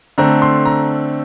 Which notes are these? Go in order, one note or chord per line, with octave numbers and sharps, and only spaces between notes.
D3 A3 C4 A#5
C6
A#5